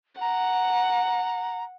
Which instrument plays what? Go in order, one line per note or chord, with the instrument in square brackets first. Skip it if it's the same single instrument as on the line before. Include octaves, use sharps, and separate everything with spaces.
[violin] F#5 [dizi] A#5